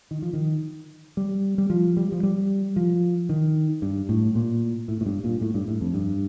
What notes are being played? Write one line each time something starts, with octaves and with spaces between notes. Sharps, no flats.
D#3
F3
D#3
G3
G3
F3
G3
F3
G3
F3
D#3
G2
A2
A#2
A2
A2
G2
A#2
A2
G2
A2
F2
G2